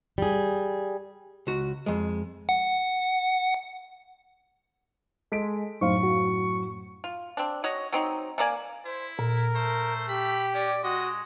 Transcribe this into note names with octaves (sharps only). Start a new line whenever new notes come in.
G3 G#4
C#2 F#4
F2 G#3
F#5
G#3 A4 B6 D7
F#2 A2 D#4 C5 F5 C#6
F#4
F4
C4 D4
F#4 C#5 D#5
F#3 C4 D#4
A3 A#3 D5 G#5
E4 C5
A#2 A#4
A3 C5
G4 B5
C#4 D5
G#3 F#4 D#5